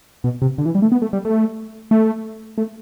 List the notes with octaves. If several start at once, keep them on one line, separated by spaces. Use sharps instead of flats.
B2
C3
D3
E3
G3
A3
B3
A3
G3
A3
A3
A3